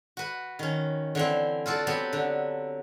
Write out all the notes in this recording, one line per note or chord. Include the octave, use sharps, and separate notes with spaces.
F#4 B4
D#3 C#4
D3 E3 C4
F4 F#4 A4 D5
F#3 B3 C4 G4
D3